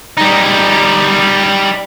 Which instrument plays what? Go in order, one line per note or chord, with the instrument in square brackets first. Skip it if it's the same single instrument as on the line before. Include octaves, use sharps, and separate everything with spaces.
[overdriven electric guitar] G3 D#4